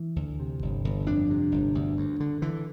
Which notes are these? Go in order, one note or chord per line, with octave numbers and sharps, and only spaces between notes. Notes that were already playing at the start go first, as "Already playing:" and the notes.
Already playing: E3
D2
C3
G1
G1
F2 D4
C3
G1
D2
D2
D3
D3 E3